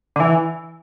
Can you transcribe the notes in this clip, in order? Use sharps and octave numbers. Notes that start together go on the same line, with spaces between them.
D3
E3